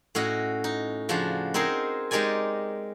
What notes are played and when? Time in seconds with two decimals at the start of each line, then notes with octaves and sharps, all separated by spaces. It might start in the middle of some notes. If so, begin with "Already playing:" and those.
0.15 A2 C#4 F#4 D#5
0.64 D#4
1.09 C#3 F3 D4 F#4
1.54 C4 D#4 G#4 A#4 C5
2.11 G#3 D#4 G4 A#4 D5 G#5